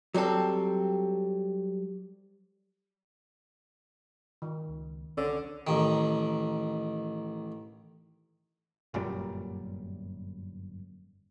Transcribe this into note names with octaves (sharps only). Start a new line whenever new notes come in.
F#3 G3 C4 A4
D#3
C#2
C2 D3 C#4 C#5
A1 D#3
G1 F#2 A#2 G3